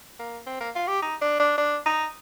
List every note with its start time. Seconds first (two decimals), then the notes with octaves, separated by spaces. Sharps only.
0.19 A#3
0.46 C4
0.60 A#3
0.75 F4
0.88 G4
1.02 D#4
1.22 D4
1.40 D4
1.58 D4
1.86 D#4